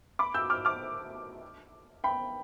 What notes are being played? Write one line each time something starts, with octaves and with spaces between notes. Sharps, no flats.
B5 D6
E6 G6
D6 F6
D6 F6
G5 B5